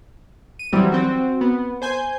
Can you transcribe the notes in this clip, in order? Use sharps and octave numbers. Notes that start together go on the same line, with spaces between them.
D#7
E3 F#3 G3 C4
C4 F#4
B3
C5 G#5 G6